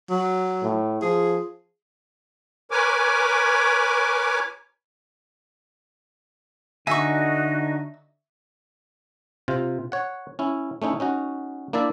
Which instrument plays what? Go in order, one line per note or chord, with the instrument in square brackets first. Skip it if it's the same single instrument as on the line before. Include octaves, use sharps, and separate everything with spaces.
[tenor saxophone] F#3
[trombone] A2
[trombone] F3 [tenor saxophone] G#4
[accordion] A#4 B4 C#5 G#5 D6
[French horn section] D3 [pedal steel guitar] D#4 G#5 [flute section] F#4 D#5 [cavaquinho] E5 C#6
[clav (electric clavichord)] C3 F4
C#5 F#5
C#4 E4
A3 C#4 D#4 E4
C#4 D#4 F#4
A#3 D4 E4 D5 E5